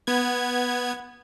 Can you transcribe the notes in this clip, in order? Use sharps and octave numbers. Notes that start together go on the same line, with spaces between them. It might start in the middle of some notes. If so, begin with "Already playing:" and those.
B3 G#6